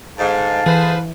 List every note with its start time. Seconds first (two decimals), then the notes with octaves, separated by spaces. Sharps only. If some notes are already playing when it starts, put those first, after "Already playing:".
0.18 G#2 D3 F5 A5
0.66 E3 G#4 B4 C5